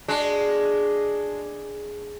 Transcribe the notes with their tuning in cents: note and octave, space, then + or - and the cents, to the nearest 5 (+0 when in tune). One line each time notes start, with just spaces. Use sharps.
G#3 +0 D4 +0 F#4 +15